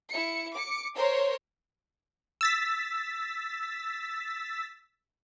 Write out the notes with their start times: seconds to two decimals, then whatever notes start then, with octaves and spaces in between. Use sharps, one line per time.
0.10 E4 C#7
0.55 D6 C#7
0.95 A#4 C5 C#5
2.41 E6 A6 B6